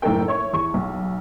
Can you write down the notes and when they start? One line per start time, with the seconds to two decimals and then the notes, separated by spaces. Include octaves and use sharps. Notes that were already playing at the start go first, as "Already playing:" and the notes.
0.02 F#1 A2 D#4 A4 A#4 G5
0.28 C#5 E5 C#6
0.53 E2 C#6
0.74 B1